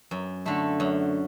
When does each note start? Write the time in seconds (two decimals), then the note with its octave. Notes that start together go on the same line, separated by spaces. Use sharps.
0.11 F#2
0.45 D3 A3 E4
0.80 F#2